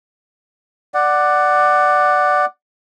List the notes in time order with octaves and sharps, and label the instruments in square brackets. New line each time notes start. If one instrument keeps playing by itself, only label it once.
[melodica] D5 F#5